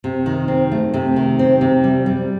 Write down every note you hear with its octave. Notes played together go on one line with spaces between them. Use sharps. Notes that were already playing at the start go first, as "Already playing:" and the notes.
C3
D#3
C4
A3
C3
D#3
C4
C3
G3
G3